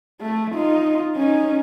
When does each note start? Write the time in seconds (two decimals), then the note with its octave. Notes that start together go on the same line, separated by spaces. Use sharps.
0.21 A3
0.54 D#4 F4
1.15 C#4 D#4